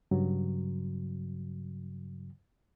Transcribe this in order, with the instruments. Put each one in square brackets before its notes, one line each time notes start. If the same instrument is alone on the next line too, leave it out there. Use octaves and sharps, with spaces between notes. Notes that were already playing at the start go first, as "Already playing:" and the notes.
[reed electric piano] G2 C#3 F#3